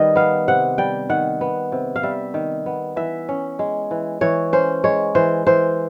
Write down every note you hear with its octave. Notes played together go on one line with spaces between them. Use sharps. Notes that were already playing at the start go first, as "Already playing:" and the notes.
Already playing: D#3 G3 B4 D#5
B3 F5
C3 F#5
G3 G5
D#3 F#5
B3
C3
F5
G3 E5
D#3
B3
E3 E5
C#4
G#3
E3
E3 C#5
C#4 C5
G#3 C#5
E3 C5
E3 C5